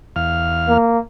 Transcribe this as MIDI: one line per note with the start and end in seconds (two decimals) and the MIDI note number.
0.16 0.77 40
0.16 0.77 77
0.16 0.77 89
0.68 0.99 58